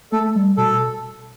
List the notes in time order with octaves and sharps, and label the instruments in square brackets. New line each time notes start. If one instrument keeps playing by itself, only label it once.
[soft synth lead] A3 [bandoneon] A4
[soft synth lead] G3
[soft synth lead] B2 [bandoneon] A4